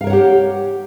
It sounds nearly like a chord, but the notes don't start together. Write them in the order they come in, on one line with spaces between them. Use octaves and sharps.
F5 A#4 C#5 F#5 G4